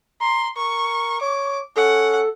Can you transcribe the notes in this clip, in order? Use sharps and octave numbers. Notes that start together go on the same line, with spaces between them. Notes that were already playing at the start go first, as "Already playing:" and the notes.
A#5 C6
A#4 C#6
C#5 D6
C#4 A4 F#5